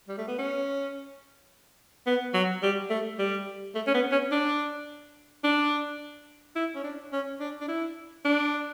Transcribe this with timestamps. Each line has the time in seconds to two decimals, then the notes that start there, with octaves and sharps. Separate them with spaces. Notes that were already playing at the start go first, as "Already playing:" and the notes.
0.08 G3
0.18 A3
0.28 B3
0.38 C#4
2.07 B3
2.34 F#3
2.62 G3
2.90 A3
3.19 G3
3.75 A3
3.87 C#4
3.94 B3
4.12 C#4
4.32 D4
5.44 D4
6.56 E4
6.75 C#4
6.84 D4
7.13 C#4
7.40 D4
7.61 D4
7.68 E4
8.25 D4